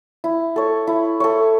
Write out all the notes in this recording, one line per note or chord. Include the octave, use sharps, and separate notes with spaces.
E4
A4 C#5
E4
A4 C#5